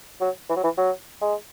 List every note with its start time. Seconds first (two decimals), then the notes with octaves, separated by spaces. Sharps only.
0.21 F#3
0.50 E3
0.56 F#3
0.64 E3
0.78 F#3
1.22 G#3